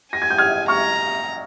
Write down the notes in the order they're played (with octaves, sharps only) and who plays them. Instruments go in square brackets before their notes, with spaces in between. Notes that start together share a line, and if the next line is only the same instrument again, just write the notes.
[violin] G#5 [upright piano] A#6
[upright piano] G#6
G6
F6 G#6
[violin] A#5 [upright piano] C#6 F6